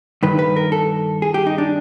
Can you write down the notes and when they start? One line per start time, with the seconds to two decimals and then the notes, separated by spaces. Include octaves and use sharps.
0.23 G2 D#3 B4
0.39 B4
0.56 A#4
0.72 A4
1.22 G#4
1.34 G4
1.47 D#4
1.58 D4